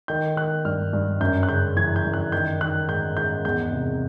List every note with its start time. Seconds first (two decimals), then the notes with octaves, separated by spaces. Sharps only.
0.08 D#3 G6
0.36 D#3 F#6
0.65 G2 F6
0.93 G2
1.20 F#2 G6
1.43 F#6
1.49 C#3 G6
1.77 E3 G#6
1.96 G6
2.05 F#2
2.14 F#6
2.32 D#3 G6
2.61 D#3 F#6
2.88 G#2 G6
3.17 G#2 G6
3.45 E2 G6
3.73 C3